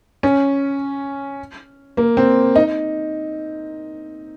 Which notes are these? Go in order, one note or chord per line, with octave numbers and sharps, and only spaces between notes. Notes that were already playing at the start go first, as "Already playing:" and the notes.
C#4
A#3
C4
D#4